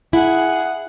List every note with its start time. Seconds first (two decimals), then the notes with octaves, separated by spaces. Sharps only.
0.13 E4 G#4 F#5